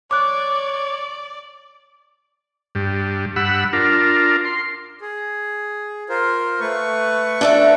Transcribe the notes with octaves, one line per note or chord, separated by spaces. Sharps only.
C#5 D5 D6 F#6
G2
G2 F#5 B5 E6
D4 F4 A#4
C6
G#4
F4 A#4 C5
A3 B4 C#6
D4 A4 E5